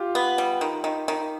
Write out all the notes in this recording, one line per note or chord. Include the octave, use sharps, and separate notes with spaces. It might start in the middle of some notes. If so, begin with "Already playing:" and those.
Already playing: F4 G4
B3
G3
D#3
D#3
D#3